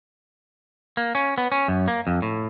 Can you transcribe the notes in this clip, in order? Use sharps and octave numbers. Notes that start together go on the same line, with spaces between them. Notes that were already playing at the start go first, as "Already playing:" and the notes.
A#3
C#4
B3
C#4
F#2
A#3
F2
A2